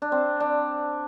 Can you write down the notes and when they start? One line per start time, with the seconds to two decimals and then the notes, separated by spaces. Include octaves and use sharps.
0.02 D4
0.12 C4
0.40 D4